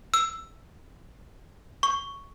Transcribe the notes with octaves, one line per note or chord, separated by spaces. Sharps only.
E6
C#6